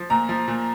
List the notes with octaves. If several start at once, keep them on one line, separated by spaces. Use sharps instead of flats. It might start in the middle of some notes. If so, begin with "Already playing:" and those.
Already playing: F3
A#2 A#5
F3
A#2